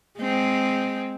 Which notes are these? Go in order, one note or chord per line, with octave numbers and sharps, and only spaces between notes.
G#3 C4